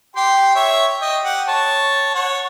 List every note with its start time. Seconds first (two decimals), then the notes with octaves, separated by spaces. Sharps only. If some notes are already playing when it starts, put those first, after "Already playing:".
0.16 G4 G5 C6
0.55 C#5 E5
1.01 D#5 G5
1.25 G4 F#5
1.48 C#5 A5
2.15 C#5 F#5